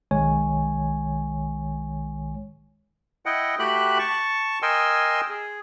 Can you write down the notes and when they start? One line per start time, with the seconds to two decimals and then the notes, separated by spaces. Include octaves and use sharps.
0.11 B1 D#3 G#3 C#5 G#5
3.26 E4 D#5 F#5 G5
3.59 A3 F#4 G4 G5 B5 F#6
3.98 A5 C#6
4.62 A#4 D#5 G5 G#5 C6 E6
5.30 G#4